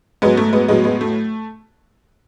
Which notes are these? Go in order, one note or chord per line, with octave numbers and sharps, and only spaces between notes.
G#2 F#3 G#3 B3
A3
G#3 B3
A2 F#3 G#3 B3
G#3 B3
A3